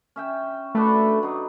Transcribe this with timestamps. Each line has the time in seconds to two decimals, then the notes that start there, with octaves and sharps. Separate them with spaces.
0.16 C#4 E5 G5
0.75 A3 D4 F#4 B4
1.23 F#3 D#4